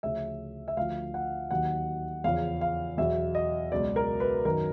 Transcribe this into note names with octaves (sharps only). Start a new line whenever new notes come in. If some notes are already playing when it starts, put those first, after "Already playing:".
D2 C#3 F3 E5
E5
D2 D3 F3 F5
F#5
D#2 D#3 F#3 F#5
E2 C#3 F3 F5
F5
E2 B2 F#3 E5
D#5
C#2 B2 F#3 D5
A#4
B4
F#2 D#3 F#3 A#4